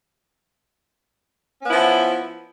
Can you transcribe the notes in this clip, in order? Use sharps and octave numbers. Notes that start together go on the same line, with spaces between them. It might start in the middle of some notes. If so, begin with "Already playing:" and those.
F3 B3 C#4 E4